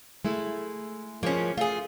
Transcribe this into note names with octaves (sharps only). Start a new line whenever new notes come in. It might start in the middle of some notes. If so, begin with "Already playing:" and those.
G#3 A3 E4
F3 G#3 A#3 C#4
A3 F4 G#4